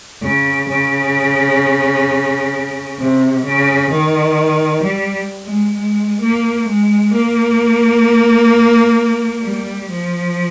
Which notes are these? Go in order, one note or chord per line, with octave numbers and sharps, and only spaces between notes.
C#3
C#3
C3
C#3
D#3
G3
G#3
G#3
A#3
G#3
A#3
G3
F3